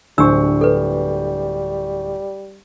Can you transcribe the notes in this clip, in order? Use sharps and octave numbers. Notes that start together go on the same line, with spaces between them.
D1 G3 D4 C5 C#6 E6
A4 B4